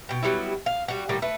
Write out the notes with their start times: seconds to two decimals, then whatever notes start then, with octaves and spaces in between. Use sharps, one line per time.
0.09 B2 G5
0.23 F#3 G3 B3 E4
0.66 F5
0.88 G3 F#4
1.09 A2 D3 G3 A#3
1.22 A3 B4